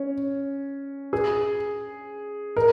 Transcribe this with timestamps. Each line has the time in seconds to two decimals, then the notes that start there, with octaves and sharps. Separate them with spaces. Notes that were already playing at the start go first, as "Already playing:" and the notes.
Already playing: C#4
1.13 G#4
2.57 A#4